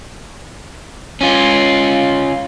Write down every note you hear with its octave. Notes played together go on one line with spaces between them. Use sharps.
C#4 F4